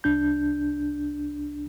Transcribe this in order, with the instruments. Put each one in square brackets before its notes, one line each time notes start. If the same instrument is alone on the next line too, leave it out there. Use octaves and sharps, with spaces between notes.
[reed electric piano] C2 D4 G6